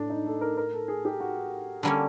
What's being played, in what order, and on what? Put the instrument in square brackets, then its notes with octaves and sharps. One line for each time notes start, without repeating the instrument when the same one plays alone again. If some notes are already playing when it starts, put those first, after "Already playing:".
Already playing: [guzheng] A2 [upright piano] D4
[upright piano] D#4
A4
A#4
A#4
A4
G#4
G4
F#4
[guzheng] D3 G3 A#3 C#4